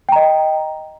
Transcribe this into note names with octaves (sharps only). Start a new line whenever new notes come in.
D#5 G5 A#5